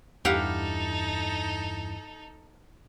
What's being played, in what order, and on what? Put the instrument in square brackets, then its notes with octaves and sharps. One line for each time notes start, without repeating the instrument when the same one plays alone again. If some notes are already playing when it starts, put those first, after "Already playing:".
[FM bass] E2 [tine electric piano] G2 E4 [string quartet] D#4 A4 [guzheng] G4 F5 F#5